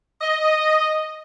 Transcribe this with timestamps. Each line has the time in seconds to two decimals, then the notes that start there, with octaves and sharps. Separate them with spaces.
0.21 D#5